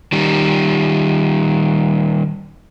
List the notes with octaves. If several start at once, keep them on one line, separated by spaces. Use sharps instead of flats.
D#3 G3